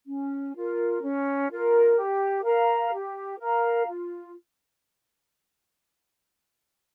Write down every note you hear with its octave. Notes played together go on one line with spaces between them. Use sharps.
C#4
F4 A#4
C#4
F4 A#4
G4
A#4 F5 A#5
G4
A#4 F5 A#5
F4